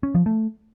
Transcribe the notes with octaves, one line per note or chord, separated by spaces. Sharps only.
C#4
F3
A3